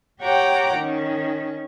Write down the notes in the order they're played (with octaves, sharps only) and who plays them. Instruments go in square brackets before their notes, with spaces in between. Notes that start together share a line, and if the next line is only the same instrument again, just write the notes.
[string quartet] G4 C#5 F#5 G5 A#5 D6
D#3 C#4